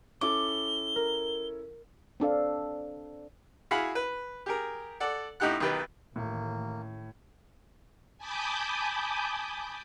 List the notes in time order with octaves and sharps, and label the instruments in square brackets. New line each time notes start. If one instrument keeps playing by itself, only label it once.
[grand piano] C#4 E4 A4 [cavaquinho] D6 [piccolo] G7
[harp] A#4
[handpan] C4 D4 A4 F5
[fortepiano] E4 F#4 G#4 F5 F#5 B5
B4
G4 G#4 A#4
A4 D5 F#5
A2 D#4 E4 G4 F#5 F#6
B1 D#3 G4 B4
[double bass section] A1 D#2 [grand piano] A2 [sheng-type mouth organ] A#3
[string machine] G#5 A5 B5 D6 D#6 G6